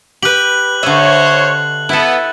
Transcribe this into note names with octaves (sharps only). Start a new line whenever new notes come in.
G4 B4 F#6 F#7
D3 C5 C#5 D#5 E5
B3 E4 A4